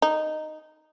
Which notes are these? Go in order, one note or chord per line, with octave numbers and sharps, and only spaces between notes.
D#4